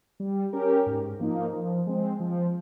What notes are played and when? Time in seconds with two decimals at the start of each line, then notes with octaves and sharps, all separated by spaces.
0.20 G3
0.53 C#4 G4 A#4
0.86 G#2
1.20 F3 A#3 D#4
1.53 F3
1.87 G#3 C4
2.20 F3